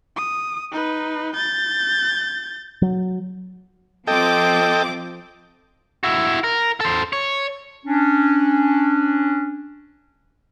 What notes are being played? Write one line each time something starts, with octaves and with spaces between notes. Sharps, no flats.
D#6
D#4 B4
G6 A6
F#3
F3 C4 A4 D#5 G5 D6
E4 F#4
A#4
A4 C5
C#5
C#4 D4